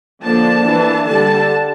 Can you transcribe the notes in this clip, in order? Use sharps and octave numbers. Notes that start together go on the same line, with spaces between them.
D3 F3 A#3 D4 A5
E3 A#3 D4
D3 G3 D4 A5